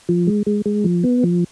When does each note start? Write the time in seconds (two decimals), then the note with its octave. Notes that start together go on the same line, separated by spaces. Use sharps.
0.09 F3
0.27 G#3
0.47 G#3
0.66 G#3
0.84 F3
1.04 B3
1.24 F3